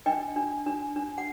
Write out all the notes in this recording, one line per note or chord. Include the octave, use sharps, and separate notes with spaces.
D4 D#5 G5
D4
D4
D4
F#5